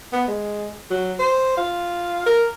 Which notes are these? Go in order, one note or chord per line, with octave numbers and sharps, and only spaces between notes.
B3
G#3
F#3
C5
F4
A#4